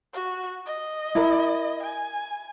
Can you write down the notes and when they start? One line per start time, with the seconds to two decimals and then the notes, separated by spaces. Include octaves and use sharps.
0.13 F#4
0.66 D#5
1.15 E4 A#4
1.83 G#5